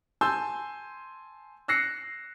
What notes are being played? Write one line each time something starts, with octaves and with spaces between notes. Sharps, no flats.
G#5 A5 C6 E6 G6
E6 F#6 A#6 C7 C#7